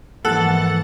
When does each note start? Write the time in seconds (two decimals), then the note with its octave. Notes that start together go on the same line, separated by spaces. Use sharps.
0.25 G#2 E3 F3 A#3 A4 F#5 A6